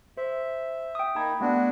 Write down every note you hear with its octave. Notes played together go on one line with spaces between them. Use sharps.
C5 E5
G5 D#6
A#3 D#4 A5 B5 G#6
A3 B3 D4 F#4